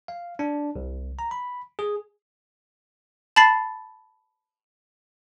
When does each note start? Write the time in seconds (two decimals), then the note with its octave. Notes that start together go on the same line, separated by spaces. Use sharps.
0.08 F5
0.39 D4
0.76 C2
1.19 A#5
1.31 B5
1.79 G#4
3.36 A5 B5 A6 C7